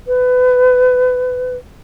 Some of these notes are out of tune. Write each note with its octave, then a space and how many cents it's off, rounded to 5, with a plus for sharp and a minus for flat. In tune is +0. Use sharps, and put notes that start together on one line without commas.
B4 +25